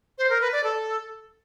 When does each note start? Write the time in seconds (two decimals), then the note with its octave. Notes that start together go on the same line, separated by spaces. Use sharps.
0.18 C5
0.30 A#4
0.41 B4
0.52 D5
0.64 A4